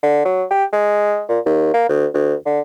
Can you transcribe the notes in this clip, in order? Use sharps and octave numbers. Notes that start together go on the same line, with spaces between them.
D3
F#3
G4
G#3
A#2
D#2
A#3
D2
D2
D3